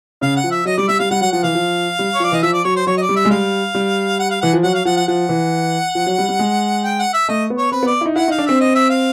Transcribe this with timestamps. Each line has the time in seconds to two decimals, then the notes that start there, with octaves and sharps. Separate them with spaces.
0.21 C#3 F5
0.36 F#5
0.44 F3
0.51 E5
0.65 F#3 D#5
0.77 G3 D5
0.88 G3 E5
0.99 G3 F5
1.11 G3 F#5
1.21 F#3 F#5
1.32 F3 F#5
1.43 E3 F5
1.55 F3
1.99 G3
2.14 C#5
2.20 F3
2.24 D5
2.32 E3 D#5
2.42 F3 E5
2.53 D5
2.64 F#3 C#5
2.76 C5
2.87 F#3 C#5
2.97 D#5
3.02 D5
3.09 G3
3.16 E5
3.25 G#3
3.30 G3 F5
3.75 G3
4.19 F#5
4.30 F5
4.41 E3 F#5
4.53 F3
4.63 F#3 F#5
4.74 F5
4.85 F3 F#5
4.97 F#5
5.07 F3 F#5
5.29 E3
5.95 F3
6.06 F#3
6.18 G3
6.29 G3
6.39 G#3
6.84 G5
6.99 F#5
7.13 E5
7.28 A3 D#5
7.50 B3
7.58 C#5
7.72 C4 B4
7.83 B3
7.87 D5
8.01 E4
8.06 D#4
8.16 E4 F#5
8.28 D#4
8.31 F5
8.38 D4
8.46 C4 E5
8.60 D#5
8.75 E5
8.90 F5